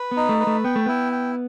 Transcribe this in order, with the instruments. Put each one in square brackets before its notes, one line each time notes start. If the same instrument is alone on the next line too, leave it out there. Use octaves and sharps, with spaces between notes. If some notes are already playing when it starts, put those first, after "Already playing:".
Already playing: [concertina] B4
[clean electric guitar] B3
[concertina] D#4
[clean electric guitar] A3
[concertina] B4
[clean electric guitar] A3
[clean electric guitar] B3 [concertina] G5
[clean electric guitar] A3
[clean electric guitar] B3 [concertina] E4
[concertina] G5